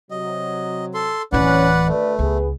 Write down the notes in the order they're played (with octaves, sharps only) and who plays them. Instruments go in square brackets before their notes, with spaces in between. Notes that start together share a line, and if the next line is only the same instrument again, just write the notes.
[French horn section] C3 F#3 [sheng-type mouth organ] D#5
[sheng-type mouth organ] A4 C6
[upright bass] D1 E3 [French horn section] C#4 [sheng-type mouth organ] B4 D5 F#5
[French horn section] D2 B4 D5 [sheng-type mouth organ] A3
[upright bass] C#2 [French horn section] B3 G#4 B4